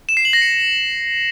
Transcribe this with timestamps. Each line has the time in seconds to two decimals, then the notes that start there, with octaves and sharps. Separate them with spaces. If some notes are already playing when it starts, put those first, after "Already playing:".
0.09 E7
0.17 C7
0.25 F#7
0.33 A#6
0.42 C#7